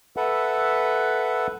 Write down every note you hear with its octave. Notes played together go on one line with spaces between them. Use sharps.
A4 B4 E5 F#5